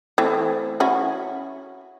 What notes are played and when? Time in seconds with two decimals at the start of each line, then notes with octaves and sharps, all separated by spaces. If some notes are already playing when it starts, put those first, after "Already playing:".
0.18 E3 A3 C4
0.80 C#4 E4 F#4